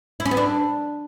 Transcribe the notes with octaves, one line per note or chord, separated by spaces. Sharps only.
E4
C#4
B3
D4